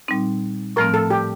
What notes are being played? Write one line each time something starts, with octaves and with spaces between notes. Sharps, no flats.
A#2 G3 C4 D#4
A2 F3 A3 C4 A#4
A4
G4